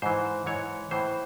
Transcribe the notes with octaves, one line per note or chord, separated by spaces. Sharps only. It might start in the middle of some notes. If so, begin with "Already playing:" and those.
G#2 E3 C5
G#2 E3 C#5
A2 E3 C5